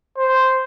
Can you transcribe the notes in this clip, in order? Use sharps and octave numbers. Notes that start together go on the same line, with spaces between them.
C5